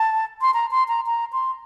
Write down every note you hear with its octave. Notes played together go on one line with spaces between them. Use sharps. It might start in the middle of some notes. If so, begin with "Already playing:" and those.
Already playing: A5
C6
A#5
C6
A#5
A#5
C6